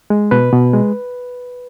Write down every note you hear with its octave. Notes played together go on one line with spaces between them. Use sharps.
G#3
B2 B4
B2
G#3